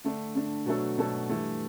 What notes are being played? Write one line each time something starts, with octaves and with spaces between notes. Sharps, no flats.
D3 A3 D4
D3 A3 D4
B2 F#3 A3 D4 A4
B2 F#3 A3 D4 A4
G2 E3 A3